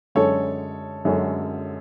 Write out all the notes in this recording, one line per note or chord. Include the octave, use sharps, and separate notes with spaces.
F#2 D3 G#3 C#4 A4 C#5
F#2 D3 G#3 C#4